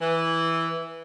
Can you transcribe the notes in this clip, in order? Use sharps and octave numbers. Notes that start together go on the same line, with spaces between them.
E3